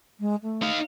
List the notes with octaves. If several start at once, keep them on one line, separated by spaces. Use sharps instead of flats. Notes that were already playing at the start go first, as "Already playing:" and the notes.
G#3
A3
D#4 F5